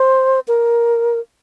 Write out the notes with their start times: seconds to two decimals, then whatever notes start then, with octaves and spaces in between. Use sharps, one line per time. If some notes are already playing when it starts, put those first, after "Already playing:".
Already playing: C5
0.48 A#4